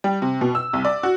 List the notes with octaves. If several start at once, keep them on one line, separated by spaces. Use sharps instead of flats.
G3
C3
B2
E6
C2
D5
F#4